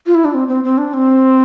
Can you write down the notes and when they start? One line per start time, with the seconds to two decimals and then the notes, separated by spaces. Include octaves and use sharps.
0.06 F4
0.14 E4
0.25 D4
0.34 C4
0.48 C4
0.64 C4
0.78 D4
0.93 C4